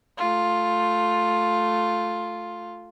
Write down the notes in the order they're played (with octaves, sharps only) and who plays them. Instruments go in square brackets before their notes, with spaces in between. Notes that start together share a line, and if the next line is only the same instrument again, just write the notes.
[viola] A3 F4